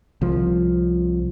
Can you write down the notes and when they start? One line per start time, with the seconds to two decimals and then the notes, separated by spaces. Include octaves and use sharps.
0.21 C2 F3